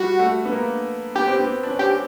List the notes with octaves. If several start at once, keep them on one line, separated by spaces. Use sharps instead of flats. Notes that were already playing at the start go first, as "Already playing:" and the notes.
Already playing: G3 F#4
A3
B3
A#3
B3 G4
C4
B3
D4
C#4
C4 G4